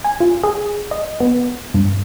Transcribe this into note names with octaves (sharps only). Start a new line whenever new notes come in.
G#5
F4
G#4
D#5
B3
G2